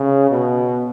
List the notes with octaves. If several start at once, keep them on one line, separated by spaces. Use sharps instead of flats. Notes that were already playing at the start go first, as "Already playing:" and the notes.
Already playing: C#3
B2